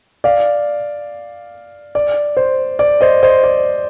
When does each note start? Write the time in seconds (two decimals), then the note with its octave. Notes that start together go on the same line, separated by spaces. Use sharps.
0.24 D5 F5
1.95 D5
2.37 C5
2.79 D5
3.01 C5 D#5
3.23 C5 D#5
3.43 D5